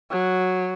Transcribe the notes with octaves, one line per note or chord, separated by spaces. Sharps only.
F#3